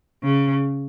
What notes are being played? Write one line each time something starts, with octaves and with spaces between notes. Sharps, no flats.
C#3